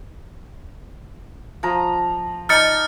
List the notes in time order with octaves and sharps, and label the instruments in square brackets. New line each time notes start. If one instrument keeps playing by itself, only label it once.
[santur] F3 A#5
[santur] D#4 D5 [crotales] F6 A6 C#7